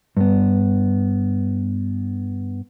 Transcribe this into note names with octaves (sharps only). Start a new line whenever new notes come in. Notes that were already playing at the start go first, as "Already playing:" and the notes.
G2 B3